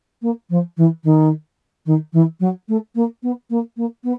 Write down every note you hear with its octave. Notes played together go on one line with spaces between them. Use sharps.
A#3
F3
E3
D#3
D#3
E3
F#3
A3
A#3
B3
A#3
A#3
B3